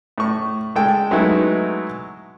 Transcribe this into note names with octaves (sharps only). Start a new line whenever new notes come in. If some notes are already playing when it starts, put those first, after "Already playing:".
A2 C#6
G#3 A4 G5
F#3 G#3 A3 B3 D#4 E4